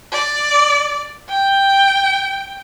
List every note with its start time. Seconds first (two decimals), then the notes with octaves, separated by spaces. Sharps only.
0.12 D5
1.29 G5